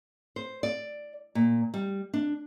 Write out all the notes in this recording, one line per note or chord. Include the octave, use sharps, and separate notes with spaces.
C5
D5
A#2
G3
D4